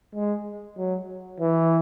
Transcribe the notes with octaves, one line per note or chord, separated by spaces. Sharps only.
G#3
F#3
E3